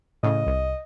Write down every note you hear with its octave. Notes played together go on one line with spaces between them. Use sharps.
A2 C#3 D#5
C2